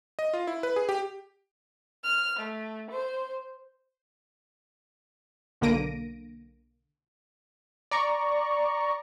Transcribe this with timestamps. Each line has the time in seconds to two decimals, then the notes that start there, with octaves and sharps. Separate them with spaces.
0.19 D#5
0.34 F4
0.47 E4
0.63 B4
0.76 G#4
0.89 G4
2.03 F6
2.37 A3
2.90 C5
5.61 B1 D3 A#3 A#6 D7 D#7
7.91 D5 A#5 C#6